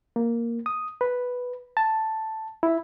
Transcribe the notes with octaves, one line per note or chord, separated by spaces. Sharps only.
A#3
D#6
B4
A5
E4